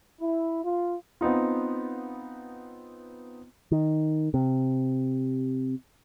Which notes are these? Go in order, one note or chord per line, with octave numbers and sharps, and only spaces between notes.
E4
F4
B3 C4 D#4 F4
D#3
C3